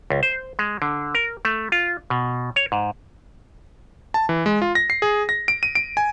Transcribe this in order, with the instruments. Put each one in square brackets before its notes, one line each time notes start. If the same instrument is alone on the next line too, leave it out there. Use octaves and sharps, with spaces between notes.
[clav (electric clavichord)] C#2
C5
G#3
D3
A#4
A3
F4
B2
C#5
G#2
[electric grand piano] A5
E3
G#3
F4
A#6
C7
G#4
A#6
D7
D#7
D7
G#5